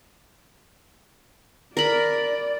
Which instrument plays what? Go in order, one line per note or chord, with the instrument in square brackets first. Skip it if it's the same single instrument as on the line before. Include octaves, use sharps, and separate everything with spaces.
[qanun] A#4 B5 [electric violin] D5